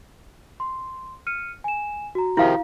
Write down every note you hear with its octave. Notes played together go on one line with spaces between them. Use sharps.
C6
F6 C#7 D#7
G#5 E7
F#4 A#5
C3 D#3 F3 E4 F5